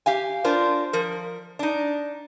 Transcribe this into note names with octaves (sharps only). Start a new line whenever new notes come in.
G4 F5 G#5
D4 F4 A#4 C5
F3 A#4
D4 D#4